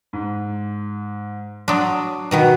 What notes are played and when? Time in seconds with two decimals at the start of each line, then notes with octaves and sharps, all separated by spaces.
0.13 G#2
1.68 F#3 D4 C6 D#6
2.31 B2 D#3 F#3 B3 F#4